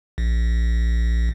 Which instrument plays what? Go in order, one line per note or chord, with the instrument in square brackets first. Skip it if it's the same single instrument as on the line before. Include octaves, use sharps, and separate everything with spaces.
[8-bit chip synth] A#1